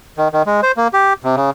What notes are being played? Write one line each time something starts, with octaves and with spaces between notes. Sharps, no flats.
D#3
D#3
G#3
C5
A#3
G4
C3
C#3